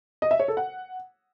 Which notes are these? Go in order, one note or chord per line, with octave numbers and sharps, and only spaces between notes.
D#5
E5
C#5
A4
F#5